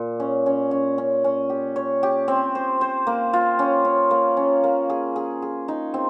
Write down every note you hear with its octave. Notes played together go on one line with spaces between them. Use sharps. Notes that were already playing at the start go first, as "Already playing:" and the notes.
Already playing: A#2
C#4
C#4
C#4
C#4
C#4
G4
C#5
G4
C4
C5
C5
A#3
F4
C#4
C#4
A#3
C#4
A#3
G#4
G#4
G#4
D#4
C4